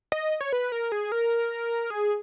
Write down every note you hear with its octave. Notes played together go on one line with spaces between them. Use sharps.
D#5
C#5
B4
A#4
G#4
A#4
G#4